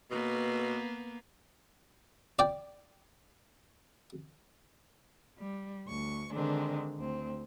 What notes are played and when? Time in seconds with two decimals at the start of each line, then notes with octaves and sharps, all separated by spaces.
0.11 B2 A#3 B3
2.39 D5 G5
5.39 G3
5.87 D2 C#6
6.33 D3 D#3 G#3 C4 D4
6.98 D2 C4